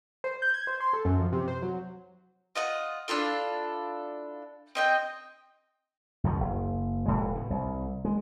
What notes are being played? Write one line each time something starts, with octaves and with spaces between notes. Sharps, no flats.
C5
G6
G#6
C5
C6
A4
F#2
F3
C3
C5
F#3
F4 D#5 F#5
D4 E4 F4 A4
C4 D#5 G5
C#2 F#2 B2 F3
F#1
F1 A2 G#3
B2
C2
G#3